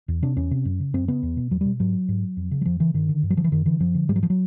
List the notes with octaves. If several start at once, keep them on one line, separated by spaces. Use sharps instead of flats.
E2
C3 D4
E2 C#4
C3
F#2
C#3
F#2 C4
C#3 B3
E2
B2
E2 F#3
B2 G3
G#2 F#3
G#2
F2
C#3
F#3
F2 F3
C#3 E3
G2 D#3
D3
G2
F#3
D3 F3
E3
F#2 D#3
D3 E3
F#2 F3
D3
G#2 G3
F#3
F3
F#3